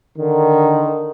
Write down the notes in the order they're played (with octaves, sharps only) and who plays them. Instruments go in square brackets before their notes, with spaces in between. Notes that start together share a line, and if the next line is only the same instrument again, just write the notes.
[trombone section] D3 D#3